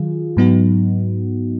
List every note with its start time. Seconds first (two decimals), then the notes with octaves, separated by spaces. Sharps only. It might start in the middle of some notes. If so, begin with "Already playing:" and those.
Already playing: D#3 F#3 F4 G#4
0.37 G#2 F#3 B3 D#4 F#4